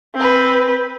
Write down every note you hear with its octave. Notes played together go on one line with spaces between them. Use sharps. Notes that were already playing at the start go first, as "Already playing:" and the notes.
C4 B4